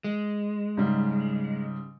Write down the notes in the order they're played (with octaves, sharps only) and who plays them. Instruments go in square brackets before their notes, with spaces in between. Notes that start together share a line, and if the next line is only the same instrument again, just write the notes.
[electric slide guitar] G#3
[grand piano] G#2 C#3 G3